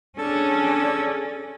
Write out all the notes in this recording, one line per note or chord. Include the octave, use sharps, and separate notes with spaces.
C#4 D4 G#4 A4